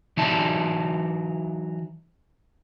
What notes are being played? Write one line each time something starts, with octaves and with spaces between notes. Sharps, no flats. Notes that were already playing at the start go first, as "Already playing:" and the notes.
E3 F#3 D#4 D5 E5 A5